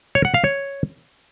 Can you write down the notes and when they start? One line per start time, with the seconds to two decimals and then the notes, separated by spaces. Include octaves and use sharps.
0.15 C#5
0.25 F#5
0.34 F5
0.44 C#5